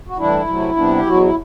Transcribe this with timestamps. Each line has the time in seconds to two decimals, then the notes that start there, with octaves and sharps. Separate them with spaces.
0.08 F#4
0.18 A2 E3 G3 D4 E4
0.47 C3 F#3 A3
0.76 C3 G3 B3 D4
0.95 G4
1.06 E2 B2 F#3 F#4
1.22 E4